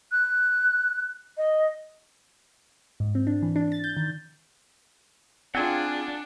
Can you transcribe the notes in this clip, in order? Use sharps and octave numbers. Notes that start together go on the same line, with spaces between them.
F#6
D#5
G#2
C4
D4
E3
D4
A6
G6
D#3
C4 D4 F4 G#4 F#5 G#5